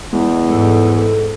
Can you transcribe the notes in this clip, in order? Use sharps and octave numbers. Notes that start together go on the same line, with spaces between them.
E2 G#3
G#2 A4